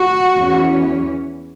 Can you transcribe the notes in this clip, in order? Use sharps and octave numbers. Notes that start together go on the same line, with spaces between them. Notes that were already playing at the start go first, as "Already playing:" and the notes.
Already playing: F#4
E2 E3 C#4